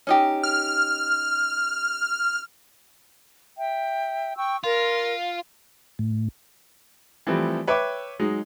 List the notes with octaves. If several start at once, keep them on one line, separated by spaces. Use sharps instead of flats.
C#4 D#4 G4
F6
E5 G5
G5 C#6 E6
F4 A#4
A2
E3 F3 G3 A3 C4
B4 C#5 E5 G5 D6
F#3 G#3 D#4